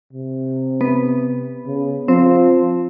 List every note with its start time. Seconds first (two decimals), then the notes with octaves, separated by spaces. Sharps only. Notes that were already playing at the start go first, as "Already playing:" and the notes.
0.13 C3
0.81 B3
1.67 C#3
2.08 F3 C4